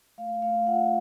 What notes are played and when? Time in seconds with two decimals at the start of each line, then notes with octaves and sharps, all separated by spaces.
0.18 A3 F5
0.42 A3 F5
0.67 F4 F#5